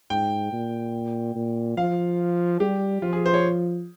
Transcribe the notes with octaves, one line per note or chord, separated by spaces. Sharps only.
G#2 G5
A#2
A#2
F3 F5
G3 G4
F3 F4
G#4
C5
C#5